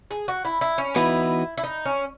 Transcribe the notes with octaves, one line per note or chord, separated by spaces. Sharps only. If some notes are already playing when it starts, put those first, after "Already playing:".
G#4
F#4
E4
E4
C#4
E3 B3 D#4 E4 F#4 B4
E4
D#4
C#4